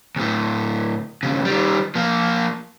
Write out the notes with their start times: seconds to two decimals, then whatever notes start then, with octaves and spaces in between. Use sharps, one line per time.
0.16 D2 A2
1.23 D#2 C#3
1.45 D#3 G3
1.95 F3 A#3